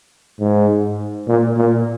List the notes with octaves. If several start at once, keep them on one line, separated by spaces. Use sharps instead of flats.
G#2
A#2
A#2